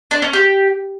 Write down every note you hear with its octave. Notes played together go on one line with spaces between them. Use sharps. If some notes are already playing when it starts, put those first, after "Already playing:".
D4
C#4
G4